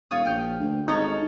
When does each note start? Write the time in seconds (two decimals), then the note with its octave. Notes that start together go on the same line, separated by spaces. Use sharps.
0.11 E1 F4 C#5 D#6
0.25 A#1 G5 F6 G6
0.60 D2
0.88 G#1 C#4 D#4 A4 C#5